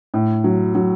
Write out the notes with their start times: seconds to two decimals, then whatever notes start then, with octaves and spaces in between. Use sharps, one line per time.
0.14 A2
0.44 F#3
0.75 F#3